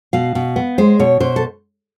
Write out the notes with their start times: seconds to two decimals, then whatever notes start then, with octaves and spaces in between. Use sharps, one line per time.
0.13 B2 F5
0.35 B2
0.56 B3
0.78 G#3 C5
0.99 B2 C#5
1.20 B2 C5
1.36 A4